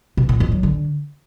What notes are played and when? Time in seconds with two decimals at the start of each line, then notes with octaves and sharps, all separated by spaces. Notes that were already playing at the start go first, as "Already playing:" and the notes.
0.17 B2
0.29 A#2
0.40 F2
0.52 F#3
0.63 D3